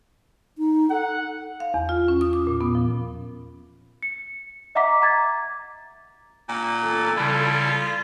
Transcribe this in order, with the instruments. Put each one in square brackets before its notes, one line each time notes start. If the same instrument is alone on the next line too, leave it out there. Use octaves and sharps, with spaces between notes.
[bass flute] D#4
[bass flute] A4 [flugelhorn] F#5
[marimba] F5
E2
F4
C#4
D#6
D6
A#2
B3
F3
[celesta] C#7
D#5 E5 F#5 A#5 D6 B6
A#5 D6 G#6 A6
[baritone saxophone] A#2
[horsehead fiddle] A4
[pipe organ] C#3 G3 E4 [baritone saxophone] F4